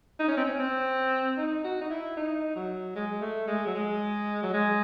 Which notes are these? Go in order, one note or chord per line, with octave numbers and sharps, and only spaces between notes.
D#4
C#4
C4
C#4
C4
D#4
F#4
D#4
E4
D#4
F#3
G#3
A3
G#3
F#3
G#3
F#3
G#3